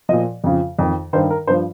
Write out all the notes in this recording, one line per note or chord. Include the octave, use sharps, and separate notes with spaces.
A#2 F3 D#5
F2 C#3 F3
F2 D#3
G2 D#3 C5
A#4
G2 F3 C5